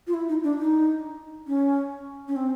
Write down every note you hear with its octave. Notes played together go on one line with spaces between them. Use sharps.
F4
E4
D#4
D4
D#4
C#4
C#4
C4